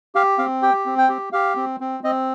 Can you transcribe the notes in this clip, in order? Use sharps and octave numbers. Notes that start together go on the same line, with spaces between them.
G4 F5
C4 F5
G4 G5
C4
G5
G4
G4 F5
C4
C4
C4 D#5